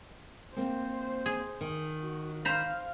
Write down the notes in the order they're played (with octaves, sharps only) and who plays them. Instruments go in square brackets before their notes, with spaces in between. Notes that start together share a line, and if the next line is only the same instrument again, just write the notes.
[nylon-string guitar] A#3 C4 [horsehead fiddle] C5
[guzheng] G#4
[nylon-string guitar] D#3
[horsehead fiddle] F#4
[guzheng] C5 A#5 B5 [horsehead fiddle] F5